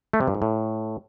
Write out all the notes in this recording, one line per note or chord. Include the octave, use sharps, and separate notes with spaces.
A3
C3
G2
G#2
A2